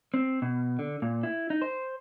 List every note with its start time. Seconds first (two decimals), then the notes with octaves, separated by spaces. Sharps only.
0.14 C4
0.42 B2
0.79 D3
1.02 A#2
1.23 E4
1.50 D#4
1.62 C5